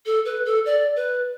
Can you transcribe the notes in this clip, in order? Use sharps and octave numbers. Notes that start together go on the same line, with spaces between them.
A4
B4
A4
D5
B4